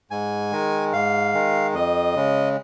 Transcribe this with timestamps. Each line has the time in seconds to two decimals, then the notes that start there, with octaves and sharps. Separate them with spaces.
0.11 G#2 G#5
0.52 D#3 G#3
0.92 G#2 F5
1.34 D#3 G#3
1.74 F2 D#5
2.16 C#3 G#3